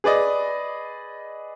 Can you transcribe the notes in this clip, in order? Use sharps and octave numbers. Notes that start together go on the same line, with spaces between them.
G#4 B4 D5 D#5